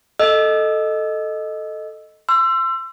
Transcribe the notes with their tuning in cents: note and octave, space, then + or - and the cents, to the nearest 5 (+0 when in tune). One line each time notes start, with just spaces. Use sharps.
A4 +0 D#5 +0 E6 +0
C6 +0 E6 +30